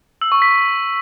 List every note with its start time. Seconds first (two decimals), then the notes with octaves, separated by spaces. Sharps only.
0.22 E6
0.32 C#6
0.42 B6